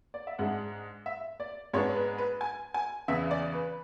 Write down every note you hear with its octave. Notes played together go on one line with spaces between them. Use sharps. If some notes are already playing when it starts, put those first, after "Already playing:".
D5
E5
G#2 G#3 D4 F#5
E5
D5
G#2 G#3 B3 D4 C#5
B4
B4
G#5
G#5
E2 C#3 E3 E5
D5
B4